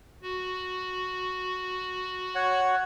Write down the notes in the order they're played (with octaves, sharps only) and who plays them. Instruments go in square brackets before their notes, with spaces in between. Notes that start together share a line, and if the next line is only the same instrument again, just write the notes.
[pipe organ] F#4
[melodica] C#5 F#5